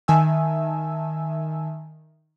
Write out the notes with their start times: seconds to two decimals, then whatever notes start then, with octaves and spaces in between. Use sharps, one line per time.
0.08 D#3 E5 G#5 A5 E6